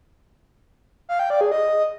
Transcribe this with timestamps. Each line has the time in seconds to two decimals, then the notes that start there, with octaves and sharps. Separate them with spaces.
1.09 F5
1.19 G5
1.30 D5
1.41 G#4
1.52 D#5